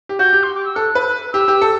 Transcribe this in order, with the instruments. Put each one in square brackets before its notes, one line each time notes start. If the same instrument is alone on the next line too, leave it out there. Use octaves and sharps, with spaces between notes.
[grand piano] G4
[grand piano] F#4 [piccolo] G6
[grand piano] G4
[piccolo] C6
D6
E6
[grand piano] A4 [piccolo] F#6
[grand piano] B4
[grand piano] G4 [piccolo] E6
[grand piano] G4
A4